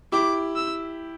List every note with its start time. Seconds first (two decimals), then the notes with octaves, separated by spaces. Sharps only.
0.12 E4 G4 D6
0.56 E6